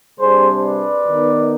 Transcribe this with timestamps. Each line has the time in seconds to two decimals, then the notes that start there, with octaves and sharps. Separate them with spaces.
0.19 C3 G3 D4 G#4 C5
0.63 B4 D5
1.07 D#3 B3 D#4